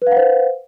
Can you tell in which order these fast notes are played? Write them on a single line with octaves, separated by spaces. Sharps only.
B4 F5 F#5 C5